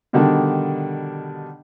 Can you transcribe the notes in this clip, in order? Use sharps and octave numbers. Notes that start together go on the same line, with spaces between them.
B2 D3 D#3 G3 D4